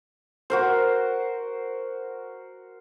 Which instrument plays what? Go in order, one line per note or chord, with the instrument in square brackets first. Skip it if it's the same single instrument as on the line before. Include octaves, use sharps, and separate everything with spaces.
[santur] F#4 A#4 C5